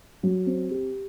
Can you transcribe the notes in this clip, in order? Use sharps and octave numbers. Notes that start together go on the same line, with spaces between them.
F#3
C4
G4